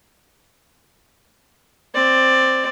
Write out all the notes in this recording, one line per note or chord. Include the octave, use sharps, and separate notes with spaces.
C4 D5